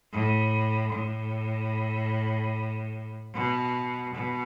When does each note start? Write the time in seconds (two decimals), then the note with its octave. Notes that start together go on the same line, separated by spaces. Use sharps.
0.12 A2
0.93 A2
3.34 B2
4.15 B2